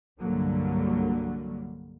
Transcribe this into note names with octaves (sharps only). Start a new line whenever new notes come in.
C2 G2 D3 F#3 G3 A#3